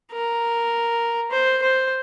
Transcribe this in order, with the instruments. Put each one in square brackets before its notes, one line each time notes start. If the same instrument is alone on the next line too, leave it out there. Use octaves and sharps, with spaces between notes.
[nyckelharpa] A#4
C5
C5